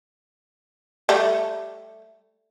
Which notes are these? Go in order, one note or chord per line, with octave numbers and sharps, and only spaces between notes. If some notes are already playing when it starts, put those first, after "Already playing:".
G3 A3